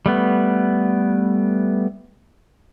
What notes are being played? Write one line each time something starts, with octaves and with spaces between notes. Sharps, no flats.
G3 A3 B3